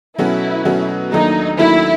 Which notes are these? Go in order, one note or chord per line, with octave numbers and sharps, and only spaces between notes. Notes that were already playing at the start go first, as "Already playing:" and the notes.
B2 F#3 A3 C#4 E4 F#4
B2 F#3 A3 C#4 F#4
D#2 D#3 F#3 A3 D4 D#4
D#2 D#3 F#3 A3 D4 E4